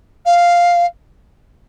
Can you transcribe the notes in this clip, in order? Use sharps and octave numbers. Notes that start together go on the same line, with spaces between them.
F5